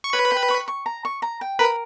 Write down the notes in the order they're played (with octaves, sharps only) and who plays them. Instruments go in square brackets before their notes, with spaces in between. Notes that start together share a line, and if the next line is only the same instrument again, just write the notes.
[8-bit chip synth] C#6
[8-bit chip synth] B4 B5 [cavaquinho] C#5
[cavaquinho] G5
C#6
C#6
A#5
C#6
A#5
G5
[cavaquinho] A#4 [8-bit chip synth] B4 B5